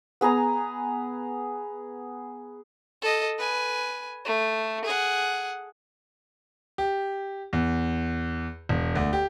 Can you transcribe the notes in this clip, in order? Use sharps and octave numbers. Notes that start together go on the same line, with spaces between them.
B3 G#4 G#5 A#5
A4 D#5
B4 G#5
A3
G#4 F#5
G4
E2
E1
D2
G4